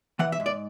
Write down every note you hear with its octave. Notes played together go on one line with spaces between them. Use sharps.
E3 F#5
E5
G#2
D5